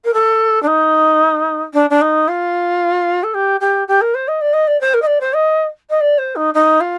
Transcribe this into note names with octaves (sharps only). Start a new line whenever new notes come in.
A#4
A4
D4
D#4
D4
D4
D#4
F4
A4
G4
G4
G4
A#4
C5
D#5
D5
D#5
D5
C5
A#4
D#5
D5
C5
D#5
D#5
D5
C5
D#4
D#4
F4